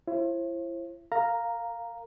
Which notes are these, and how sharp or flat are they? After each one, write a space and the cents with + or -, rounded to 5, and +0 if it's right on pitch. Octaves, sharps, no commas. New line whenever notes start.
E4 +35 C5 +35
A#4 -40 F5 +0 A#5 +0